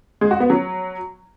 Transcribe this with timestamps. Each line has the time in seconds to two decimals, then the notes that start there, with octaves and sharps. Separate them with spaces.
0.21 G#3
0.31 F#4
0.40 B3
0.50 F#3